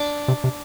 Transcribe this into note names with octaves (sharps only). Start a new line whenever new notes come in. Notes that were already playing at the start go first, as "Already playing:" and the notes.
Already playing: D4 D5
C3
C3